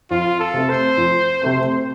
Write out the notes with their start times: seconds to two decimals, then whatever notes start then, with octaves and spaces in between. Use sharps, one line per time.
0.11 F2 F4
0.40 A4
0.54 C3 A3 C4
0.69 C5
0.97 F2
1.42 C3 A3 C4